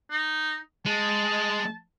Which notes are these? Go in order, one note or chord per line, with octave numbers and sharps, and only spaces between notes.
D#4
G#3 A5